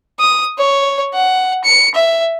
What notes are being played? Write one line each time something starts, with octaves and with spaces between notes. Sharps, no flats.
D#6
C#5
F#5
C#7
E5